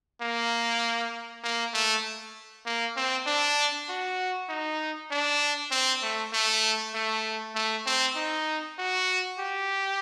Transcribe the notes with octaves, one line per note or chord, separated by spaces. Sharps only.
A#3
A#3
A3
A#3
C4
D4
F#4
D#4
D4
C4
A3
A3
A3
A3
C4
D#4
F#4
G4